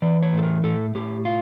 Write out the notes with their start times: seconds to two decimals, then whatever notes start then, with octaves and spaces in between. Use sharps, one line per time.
0.02 E3 D5
0.23 C#5
0.33 A2 A4
0.43 A#4
0.64 A2 A4
0.95 A2 G4
1.25 F4